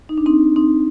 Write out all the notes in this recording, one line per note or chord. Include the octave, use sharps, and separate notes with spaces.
D#4
D4
C4 D#4
C4 D#4